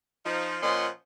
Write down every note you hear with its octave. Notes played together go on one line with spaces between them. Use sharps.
F3 D#4
A#2 F3 C#4 D#5 F#5 C6